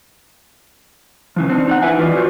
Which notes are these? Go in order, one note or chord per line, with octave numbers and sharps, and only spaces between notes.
C#3 E3 F3
C4 D4 D#4
D#4 D5 F#5
E2 E4 B4 E5 G#5
E3 F4 F#4 D5 D#5
E2 F#4 B4 C5